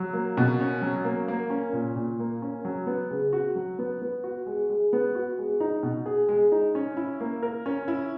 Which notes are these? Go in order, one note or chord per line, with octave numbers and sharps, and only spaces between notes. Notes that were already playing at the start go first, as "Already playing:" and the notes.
Already playing: F#3
A#3
B2
C#4
F#3
A#3
A#3
C#4
A#2
A#2
A#3
C#4
F#3
B3
C#3
F#4
F#3
B3
B3
F#4
G#3
G#3
B3
F#4
G#3
D#4
B2
G#4
G#3
D#4
C#4
E4
A#3
A#4
C#4
E4